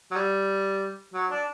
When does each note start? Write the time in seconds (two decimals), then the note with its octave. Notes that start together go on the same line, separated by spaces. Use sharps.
0.11 F#3
0.16 G3
1.14 F#3
1.31 D4